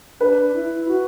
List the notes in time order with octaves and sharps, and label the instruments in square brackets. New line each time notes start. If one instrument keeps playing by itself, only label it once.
[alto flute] D4 [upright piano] B4
[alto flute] E4
F#4